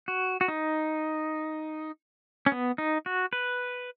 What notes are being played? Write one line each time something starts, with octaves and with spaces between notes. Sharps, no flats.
F#4
F#4
D#4
C#4
B3
D#4
F#4
B4